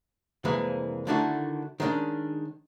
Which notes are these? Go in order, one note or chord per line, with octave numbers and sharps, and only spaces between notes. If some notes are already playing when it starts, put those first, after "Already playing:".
C2 F2 E3 G#3 A#3
D3 D#3 A3 D4 E4 F#4
D#3 G#3 B3 C#4 D4